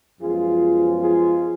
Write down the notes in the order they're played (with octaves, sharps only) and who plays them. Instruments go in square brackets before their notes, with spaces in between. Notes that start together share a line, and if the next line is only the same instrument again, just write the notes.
[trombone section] F#2 F3 G#3 B3 F4 G#4
F4 G#4